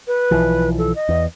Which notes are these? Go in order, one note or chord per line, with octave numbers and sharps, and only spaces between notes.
B4
B1 E3 F3
A4
D#5
E2